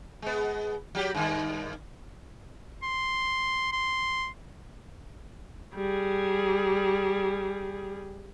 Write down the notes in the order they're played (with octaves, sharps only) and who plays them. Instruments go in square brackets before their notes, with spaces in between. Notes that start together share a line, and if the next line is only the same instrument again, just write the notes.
[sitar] G#3 B3
F#3 G4
G2 D#3
[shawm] C6
C6
[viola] G3 G#4